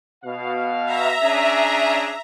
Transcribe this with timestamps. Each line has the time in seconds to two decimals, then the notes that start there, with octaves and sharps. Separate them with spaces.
0.25 B2 F5
0.85 E5 A#5
1.22 C#4 D4 G#4